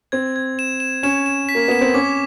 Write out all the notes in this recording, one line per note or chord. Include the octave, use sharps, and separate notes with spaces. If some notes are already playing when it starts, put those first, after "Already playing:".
C4 G#6
G#6
E7
E7
C#4 E7
E7
B6
A#3
B3 E7
C4
C#4 D6